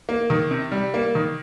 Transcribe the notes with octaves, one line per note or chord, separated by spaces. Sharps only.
A#3
D#3
C3
G3
A#3
D#3